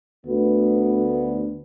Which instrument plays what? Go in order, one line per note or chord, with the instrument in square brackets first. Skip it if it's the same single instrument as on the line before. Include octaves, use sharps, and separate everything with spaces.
[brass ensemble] D2 B3